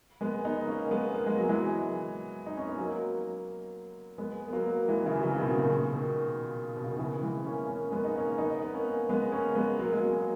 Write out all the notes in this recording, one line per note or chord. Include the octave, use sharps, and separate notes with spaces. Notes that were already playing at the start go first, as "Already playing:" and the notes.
G#3 B3
B3 D#4
A#3 C#4
G#3 B3
A#3
G#3
F#3
E3 G#3
D#4
C#4
B3
F#3 A#3
G#3 B3
B3
F#3 A#3
E3 G#3
C#3 E3
F#3
C#3 E3
C#3
B2 D#3
A#2 C#3
B2 D#3
B2
C#3
D#3
C#3 E3
E3 G#3
A#3 C#4
A#3 C#4
G#3 B3
D#4
A#3 C#4
B3 D#4
B3
A#3 C#4
G#3 B3
A#3 C#4
G#3 B3
F#3 A#3
G#3
F#3 A#3